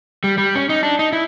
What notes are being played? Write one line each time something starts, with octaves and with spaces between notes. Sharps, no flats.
G3
G3
C#4
D#4
D4
D#4
E4